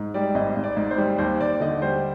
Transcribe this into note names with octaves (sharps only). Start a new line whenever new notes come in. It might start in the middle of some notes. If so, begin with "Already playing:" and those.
Already playing: G#2
G3 D5
G#1 D#5
G#1
D5
G#2
C5
G3
D#2 C5
D#2 D5
D3 D#5
G3 C5